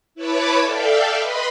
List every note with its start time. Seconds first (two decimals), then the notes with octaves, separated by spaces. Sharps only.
0.15 E4 B4 C#5 A5 B5 D6
0.60 A4 D5 E5 F5 G5
1.17 B4 D#5 B5 C6